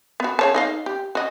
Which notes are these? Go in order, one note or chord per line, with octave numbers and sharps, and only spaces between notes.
B3 F#4
G#4 C#5 A5
D#4 D#5 F5
G4
F#4 D#5